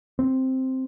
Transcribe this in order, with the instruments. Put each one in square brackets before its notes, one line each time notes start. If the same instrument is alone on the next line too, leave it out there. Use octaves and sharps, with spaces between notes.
[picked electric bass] C4